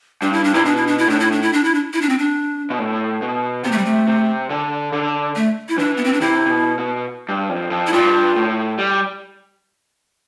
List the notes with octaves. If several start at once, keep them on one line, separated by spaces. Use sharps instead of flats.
G2 D4
E4
D4
C3 E4
B2 D4
E4
D4
E4
A2 D4
E4
D4
E4
D4
E4
D4
E4
D4
C4
D4
B2
A2
B2
C3 B3
A3
G3
A3
C3
D3
D3
A3
E4
E3 D4
B3
C4
D4
C3 E4
C3
B2
B2
G2
F2
F2
E4
G2 F4
A2
G3